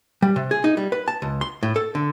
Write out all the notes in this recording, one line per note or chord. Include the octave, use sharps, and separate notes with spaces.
G3
C3
G#4
D#4
G3
B4
A5
C#2
C6
A2
A4
D3